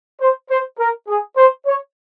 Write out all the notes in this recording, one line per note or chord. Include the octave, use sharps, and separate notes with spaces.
C5
C5
A#4
G#4
C5
C#5